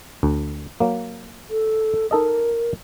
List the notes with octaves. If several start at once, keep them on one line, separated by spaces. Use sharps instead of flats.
D2
F#3 A#3
A4
D#4 A4 A#4 D#5